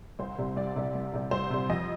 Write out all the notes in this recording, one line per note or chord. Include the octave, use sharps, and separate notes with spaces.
C2 C5
C3 G3
C2 D5
C3 G3
C2
C3 G3
C2 C5
C3 G3
F2 D#5